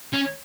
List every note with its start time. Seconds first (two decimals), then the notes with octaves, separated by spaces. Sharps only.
0.13 C#4